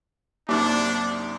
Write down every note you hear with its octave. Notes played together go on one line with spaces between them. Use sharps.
C2 F#2 A#3 D4 D#4 D5 E5